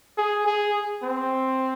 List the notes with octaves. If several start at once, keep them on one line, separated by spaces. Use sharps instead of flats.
G#4
G#4
C4